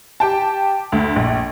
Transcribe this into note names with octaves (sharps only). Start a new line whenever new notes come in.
G4 G5 A5
D2
A#1